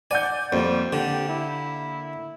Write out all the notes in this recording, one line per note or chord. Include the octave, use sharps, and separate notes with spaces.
D5 F#5 G#5 G6
F2 G3 A#3
D3 G4
E4